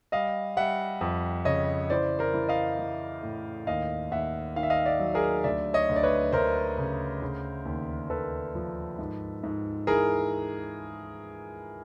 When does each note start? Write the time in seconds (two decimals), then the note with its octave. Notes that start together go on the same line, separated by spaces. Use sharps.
0.12 G3 D#5 F5
0.56 G3 E5 F#5
1.01 F2
1.45 C#3 C#5 D#5
1.90 E3 C5 D5
2.19 A#4 C5
2.34 E3
2.48 D#5 F5
2.79 E3
3.23 A2
3.67 D#2 D#5 F5
4.11 D#2 E5 F#5
4.56 D#3 F5
4.63 E5
4.70 D#5 F5
4.85 D5 E5
5.00 F#3
5.15 G#4 A#4
5.44 D2 D5 E5
5.74 C#5 D#5
5.89 D2
5.96 D5
6.03 B4 C#5
6.32 D2 A#4 C5
6.78 C#3
7.22 C#3
7.65 D#2
8.10 D#2 A4 B4
8.55 F3
8.99 G#2
9.43 G#2
9.87 E3 G#4 A#4